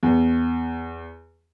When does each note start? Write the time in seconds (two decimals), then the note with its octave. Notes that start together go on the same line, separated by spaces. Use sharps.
0.03 E2